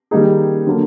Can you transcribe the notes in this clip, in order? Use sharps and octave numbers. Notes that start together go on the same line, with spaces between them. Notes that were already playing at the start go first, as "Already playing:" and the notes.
D#3 G3 A#3 D#4 G#4
D3 F#3 A#3